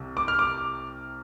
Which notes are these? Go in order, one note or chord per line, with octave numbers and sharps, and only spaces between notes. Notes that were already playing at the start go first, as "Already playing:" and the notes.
Already playing: C2 C3
D6
F6
D6